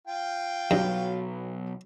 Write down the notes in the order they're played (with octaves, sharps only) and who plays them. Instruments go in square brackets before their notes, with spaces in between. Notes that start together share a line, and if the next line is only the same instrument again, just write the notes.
[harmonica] F4 G5
[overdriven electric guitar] B1 [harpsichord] G2 [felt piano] F#3